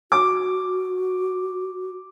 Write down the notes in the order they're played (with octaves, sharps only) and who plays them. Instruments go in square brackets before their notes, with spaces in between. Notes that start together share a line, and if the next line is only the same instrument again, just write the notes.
[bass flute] F#4 [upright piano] D6